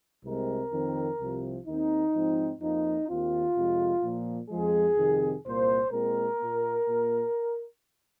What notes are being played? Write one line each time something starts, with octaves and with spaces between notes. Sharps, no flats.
C2 C3 G#3 C4 A#4
F2 D#3 C4
C2 C3 F3
D#2 D#3 C4 D#4
G#2 F3 C4
F2 F3 A#3 D#4
D#2 D#3 C4 F4
F2 C3 G#3
A#2 F3 A#3
F2 F3 G#3 G#4
F2 C3 D#3
C2 A#2 A#3 C5
A#2 G#3 C4 A#4
A#2 A#3
A#2 A#3